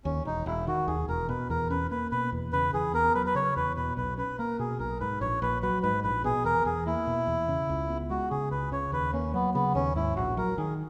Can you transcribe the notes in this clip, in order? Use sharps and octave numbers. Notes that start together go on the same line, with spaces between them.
D#2 C#4
E1 D#4
E1 E4
D#3 F#4
D#2 G#4
E1 A#4
B2 B4
E2 A#4
C#4 B4
A#3 B4
B2 B4
E2
C#3 B4
E2 G#4
B3 A#4
F#3 B4
B4
C#3 C#5
E2 B4
B2 B4
B1 B4
C#4 B4
A#3 A#4
B2 G#4
B1 A#4
G#2 B4
A#1 C#5
A#1 B4
F#3 B4
G#2 B4
A#1 B4
B2 G#4
E2 A#4
E2 G#4
A#3 E4
B2
E2
C#3
C#2
B3
G#3 F#4
C#3 G#4
C#2 B4
C#3 C#5
D#2 B4
A#3 C#4
F#3 B3
C#3 B3
D#2 C#4
G#2 E4
A#1 F#4
F#3 A#4
D#3 G#4